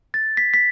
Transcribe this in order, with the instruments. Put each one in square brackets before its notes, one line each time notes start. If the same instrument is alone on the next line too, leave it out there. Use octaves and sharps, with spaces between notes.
[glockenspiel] A6
B6
B6